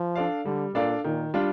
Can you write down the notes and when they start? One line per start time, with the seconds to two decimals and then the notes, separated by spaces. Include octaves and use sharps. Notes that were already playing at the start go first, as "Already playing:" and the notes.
Already playing: F3
0.15 D4 A4 D5 F5
0.45 D3 G3
0.74 A#2 D4 A4 D5 F5
1.04 A#2 D#3
1.34 G3 D4 F4